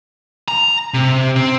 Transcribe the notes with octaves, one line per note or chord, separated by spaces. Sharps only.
A#5
C3
C4